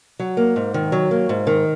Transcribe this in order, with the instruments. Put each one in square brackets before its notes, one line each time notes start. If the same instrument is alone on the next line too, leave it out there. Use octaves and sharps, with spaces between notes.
[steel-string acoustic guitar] F#3
A#3
G#2
D#3
F#3
A#3
G#2
D#3